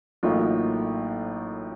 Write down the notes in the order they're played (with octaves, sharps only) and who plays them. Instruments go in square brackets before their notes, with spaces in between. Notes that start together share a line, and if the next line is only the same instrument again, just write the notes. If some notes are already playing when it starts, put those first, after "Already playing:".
[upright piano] A1 A2 F#3 A#3 D#4 F4